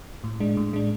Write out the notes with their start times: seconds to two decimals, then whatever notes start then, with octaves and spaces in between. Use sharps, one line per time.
0.24 A2
0.40 G#3 D4
0.57 A2
0.73 G#3 D4